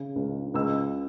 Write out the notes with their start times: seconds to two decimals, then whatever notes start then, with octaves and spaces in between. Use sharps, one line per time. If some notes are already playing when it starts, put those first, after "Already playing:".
Already playing: C#3
0.16 C#2
0.54 C#2 E6